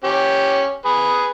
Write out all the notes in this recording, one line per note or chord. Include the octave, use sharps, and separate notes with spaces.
C#4 G4
G#4 B4